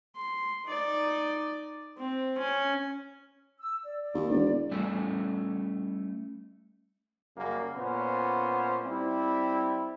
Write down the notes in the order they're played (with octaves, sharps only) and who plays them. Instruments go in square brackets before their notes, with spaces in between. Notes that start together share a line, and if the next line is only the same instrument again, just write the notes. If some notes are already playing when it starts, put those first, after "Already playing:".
[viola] C6
D#4 D5
C4
C#4
[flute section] E6
D5
D5
[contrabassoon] D#2
E1
[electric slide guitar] G3 A3 C#4 E4
[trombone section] F#2 C#3 G3 A#3
A#2 B3 C#4 C5
G3 C4 E4